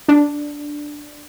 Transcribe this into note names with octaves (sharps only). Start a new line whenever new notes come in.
D4